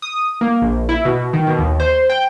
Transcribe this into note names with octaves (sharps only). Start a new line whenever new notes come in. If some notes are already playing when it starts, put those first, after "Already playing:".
D#6
A#3
A#1
E4
B2
D#3
B2
D#2
C5
G5